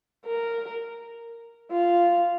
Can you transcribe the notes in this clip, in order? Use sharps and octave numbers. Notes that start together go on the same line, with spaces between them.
A#4
F4